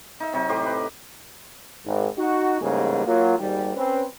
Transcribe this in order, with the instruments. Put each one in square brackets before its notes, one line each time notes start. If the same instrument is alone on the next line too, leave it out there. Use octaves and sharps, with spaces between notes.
[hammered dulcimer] D#4 E5
C3 F#3 D#4
A2 G4 C5
B4
[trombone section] G#1
D#4 F#4
A1 G#2 C#3 G3 A#3 G#4
F#3 A#3 F4
G#1 D#2 G3
C4 C#4 B4